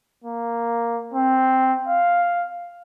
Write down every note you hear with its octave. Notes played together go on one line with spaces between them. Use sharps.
A#3
C4
F5